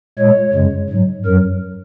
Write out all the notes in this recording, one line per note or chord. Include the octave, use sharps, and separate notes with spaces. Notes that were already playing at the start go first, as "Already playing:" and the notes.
A#2 G#3 C#5
F#2 C#3 G#3
G#2 F#3
F#2 F#3 A#4